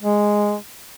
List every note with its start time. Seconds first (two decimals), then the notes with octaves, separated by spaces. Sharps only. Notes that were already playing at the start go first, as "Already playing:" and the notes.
0.02 G#3